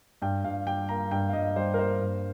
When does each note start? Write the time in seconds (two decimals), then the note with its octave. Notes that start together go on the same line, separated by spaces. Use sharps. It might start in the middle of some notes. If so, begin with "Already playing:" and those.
0.22 G2 G5
0.44 G2 F5
0.67 G3 G5
0.89 A#3 A#5
1.11 G2 G5
1.29 F5
1.33 G2 D#5
1.56 G3 C5
1.74 A#4
1.79 A#3 C5
2.01 G2